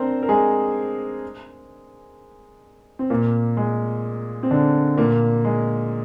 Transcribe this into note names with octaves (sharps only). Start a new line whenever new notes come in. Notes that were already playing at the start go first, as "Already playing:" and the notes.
Already playing: C4 D4 A#4 C5
A#4
G#3 G#4
C4
A#2 A#3
G#3
C4
D3 D4
A#2 A#3
G#3